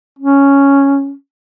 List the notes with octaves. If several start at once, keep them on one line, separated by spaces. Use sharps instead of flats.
C#4